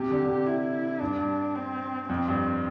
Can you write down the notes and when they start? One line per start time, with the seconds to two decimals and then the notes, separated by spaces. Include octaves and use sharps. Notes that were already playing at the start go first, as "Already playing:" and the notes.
Already playing: C3 G4
0.11 D3
0.23 D3
0.28 C3
0.47 E4
1.01 G2 D4
1.19 G2
1.55 C4
2.09 F2 C4
2.28 G2